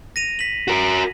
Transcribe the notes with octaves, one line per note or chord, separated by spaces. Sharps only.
A#6 D#7 F7
B6 F#7
F#4 A#4